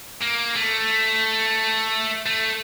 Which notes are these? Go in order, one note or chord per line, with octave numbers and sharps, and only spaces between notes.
A#3
A3
A3